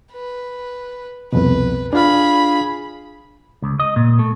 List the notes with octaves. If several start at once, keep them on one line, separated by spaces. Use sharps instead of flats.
B4
C2 F2 B2 B4
D4 F4 G#4 F5 B5
C#2
D#5
A#2
A3